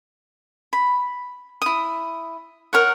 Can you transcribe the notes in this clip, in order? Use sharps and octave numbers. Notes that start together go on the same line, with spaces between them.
B5
E4 D#6
A#4 C#5 F#5